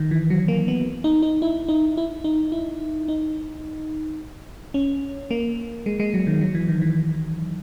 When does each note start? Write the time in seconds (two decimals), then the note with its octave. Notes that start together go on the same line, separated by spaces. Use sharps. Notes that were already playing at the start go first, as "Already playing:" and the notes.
Already playing: D#3
0.11 E3
0.30 F#3
0.48 A#3
0.68 B3
1.04 D#4
1.22 D#4
1.42 E4
1.68 D#4
1.97 E4
2.24 D#4
2.52 E4
3.08 D#4
4.74 C#4
5.31 A#3
5.86 G#3
6.00 G#3
6.14 F#3
6.27 D#3
6.41 F#3
6.55 E3
6.68 D#3
6.82 E3